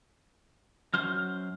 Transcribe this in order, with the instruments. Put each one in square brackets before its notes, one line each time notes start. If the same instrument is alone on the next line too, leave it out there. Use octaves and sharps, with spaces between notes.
[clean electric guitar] F#2 F#3 C5 [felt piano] F6